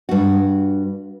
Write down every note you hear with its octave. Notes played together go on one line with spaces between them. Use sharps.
G2 F#4